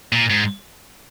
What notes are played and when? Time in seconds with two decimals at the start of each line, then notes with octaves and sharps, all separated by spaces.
0.12 A#2
0.30 G#2